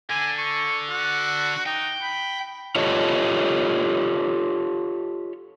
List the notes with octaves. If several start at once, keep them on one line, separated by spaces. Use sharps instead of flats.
D3 G#5
C#6
F#4
D#4 G5
B5
F4 G4 A4 C#5 D#5